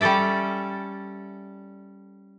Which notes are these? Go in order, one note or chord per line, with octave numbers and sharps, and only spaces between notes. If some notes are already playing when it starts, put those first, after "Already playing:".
G3 C#4 A4 D5 E5